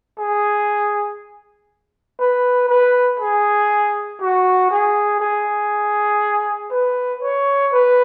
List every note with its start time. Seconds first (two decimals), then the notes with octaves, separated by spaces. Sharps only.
0.18 G#4
2.20 B4
2.69 B4
3.20 G#4
4.21 F#4
4.71 G#4
5.20 G#4
6.71 B4
7.22 C#5
7.72 B4